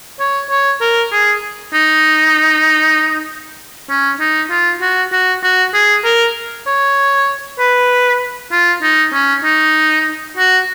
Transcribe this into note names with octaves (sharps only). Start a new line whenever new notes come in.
C#5
C#5
A#4
G#4
D#4
C#4
D#4
F4
F#4
F#4
F#4
G#4
A#4
C#5
B4
F4
D#4
C#4
D#4
F#4